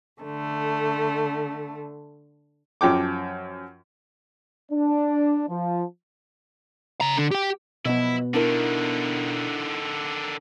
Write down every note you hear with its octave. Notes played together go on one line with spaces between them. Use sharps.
D3 A3
F#2 F3 G5 D6
D4
F3
C#3 A#5
D3
G4 G5
B2 F3 F#3 B3 E4 D#5
D3 D#3 D4 E4 A#4